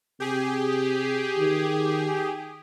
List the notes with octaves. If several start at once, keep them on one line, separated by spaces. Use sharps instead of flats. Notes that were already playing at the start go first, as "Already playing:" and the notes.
C3 G4 G#4
D#3